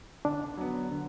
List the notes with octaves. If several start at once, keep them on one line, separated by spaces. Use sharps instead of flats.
D3 D4
F#3 B3
D3